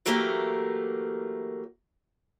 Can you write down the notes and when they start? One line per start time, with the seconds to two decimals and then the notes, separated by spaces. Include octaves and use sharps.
0.06 E3 F#3 A3 A#3 G4 A#4